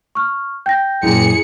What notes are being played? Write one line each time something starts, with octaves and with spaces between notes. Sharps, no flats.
C#6 F6
G5 G6 A#6
F#2 A#2 E4 G#4 C#7